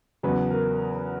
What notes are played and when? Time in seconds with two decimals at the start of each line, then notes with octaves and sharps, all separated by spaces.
0.23 E2 C#3 F#3 B4
0.50 A#4